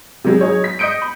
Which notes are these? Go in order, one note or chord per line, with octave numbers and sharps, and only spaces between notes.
C3 F#3 G#3
F#3 G#3 D#4 G#4 C#5
B6
D#5 D#6 G6 C#7 D7
B5